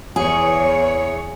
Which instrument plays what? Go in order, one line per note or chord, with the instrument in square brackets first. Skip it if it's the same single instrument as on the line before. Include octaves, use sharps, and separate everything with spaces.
[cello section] E2 C#5 [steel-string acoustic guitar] G#4